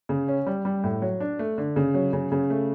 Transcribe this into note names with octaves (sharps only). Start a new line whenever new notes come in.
C#3
C#4
G3
G3
A2
F#3
D4
A3
D3
C#3
F#3
C#3
C#3
A3